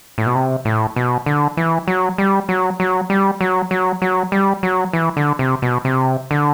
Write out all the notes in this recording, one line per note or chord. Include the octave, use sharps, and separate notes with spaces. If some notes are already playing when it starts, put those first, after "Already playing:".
A2
B2
C3
A2
B2
D3
E3
F#3
G3
F#3
F#3
G3
F#3
F#3
F#3
G3
F#3
E3
D3
C3
B2
C3
D3